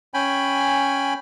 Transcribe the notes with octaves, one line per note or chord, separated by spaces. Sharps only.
C#4 G5 G#5 B5